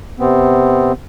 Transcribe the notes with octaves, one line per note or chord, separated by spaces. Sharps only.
C3 B3 C4